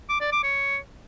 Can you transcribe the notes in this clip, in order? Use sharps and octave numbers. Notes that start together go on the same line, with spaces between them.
D6
D5
D6
C#5